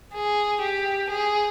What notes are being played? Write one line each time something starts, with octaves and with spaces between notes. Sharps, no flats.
G#4
G4
G#4